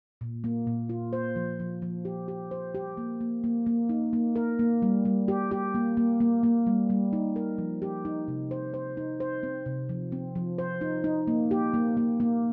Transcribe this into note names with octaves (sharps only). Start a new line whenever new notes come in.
A#2
A#3
A#2
F4
C5
F3
F3
F3
G4
G4
C5
G4
A#3
A#3
A#3
A#3
D#4
A#3
A#4
A#3
G3
G3
G4
G4
A#3
A#3
A#3
A#3
G3
G3
D#4
A#4
F3
G4
D#4
C3
C5
C5
D#4
C5
C4
C3
F3
C4
F3
C5
D#4
D#4
A#3
G4
A#3
A#3
A#3